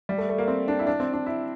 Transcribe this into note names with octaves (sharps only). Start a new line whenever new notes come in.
G3
A3
A3
A#3
C4
D4
E4
D4
C4
D4
E4